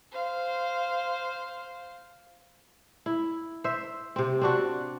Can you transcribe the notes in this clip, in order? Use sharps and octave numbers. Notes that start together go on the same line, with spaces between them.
C5 F5
E4
C5 E5
C3 C4
C4 D4 F#4